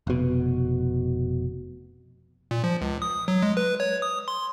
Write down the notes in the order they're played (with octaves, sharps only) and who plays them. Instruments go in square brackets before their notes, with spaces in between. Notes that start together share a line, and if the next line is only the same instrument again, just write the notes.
[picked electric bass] F1 B2
[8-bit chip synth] A#2
F3
C#2
D#6
F#3
G#3
B4
C#5
D#6
C6